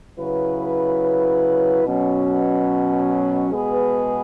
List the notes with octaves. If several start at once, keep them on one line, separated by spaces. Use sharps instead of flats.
C#3 F#3 E4 B4
B2 F#3 C#4
B2 G#3 B3 G#4 B4